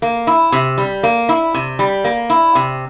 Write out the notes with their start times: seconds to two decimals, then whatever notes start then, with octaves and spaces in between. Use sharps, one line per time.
0.02 A#3
0.27 E4
0.52 C3
0.78 G3
1.03 A#3
1.29 E4
1.54 C3
1.79 G3
2.04 A#3
2.30 E4
2.55 C3